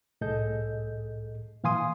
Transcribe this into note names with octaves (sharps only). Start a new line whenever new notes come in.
C2 A2 G#4 A4 D#5 G6
A#2 E3 F5 G#5 C6 D#6